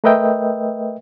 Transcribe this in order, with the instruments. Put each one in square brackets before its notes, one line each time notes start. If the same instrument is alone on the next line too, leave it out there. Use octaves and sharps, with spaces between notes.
[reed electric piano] A3 A#4 B4 D#5 E5 G5